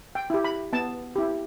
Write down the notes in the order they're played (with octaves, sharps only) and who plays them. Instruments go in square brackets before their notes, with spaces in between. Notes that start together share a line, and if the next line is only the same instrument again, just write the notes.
[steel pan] G5
E4 G4
B5
B3 A5
E4 G4